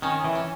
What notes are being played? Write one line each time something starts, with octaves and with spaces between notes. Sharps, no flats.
D#3 C#4
E3
C#4